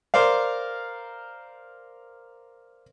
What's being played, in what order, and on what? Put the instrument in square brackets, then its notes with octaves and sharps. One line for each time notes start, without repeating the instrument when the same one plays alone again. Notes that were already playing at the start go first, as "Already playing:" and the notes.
[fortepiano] A#4 C5 D5 F5